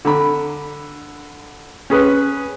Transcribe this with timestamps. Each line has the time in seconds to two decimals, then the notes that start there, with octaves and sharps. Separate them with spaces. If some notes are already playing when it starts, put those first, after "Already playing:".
0.05 D3 B5
1.90 C#4 G#4 B4